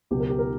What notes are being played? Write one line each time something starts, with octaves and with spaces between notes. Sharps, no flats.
C#2 B2 F#3 B3 G4
A#4
G4
A#4